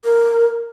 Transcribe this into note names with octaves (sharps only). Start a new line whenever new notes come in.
A#4